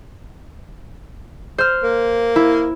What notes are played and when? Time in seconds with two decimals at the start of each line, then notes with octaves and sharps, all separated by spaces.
1.58 C5 F6
1.83 A#3
2.36 E4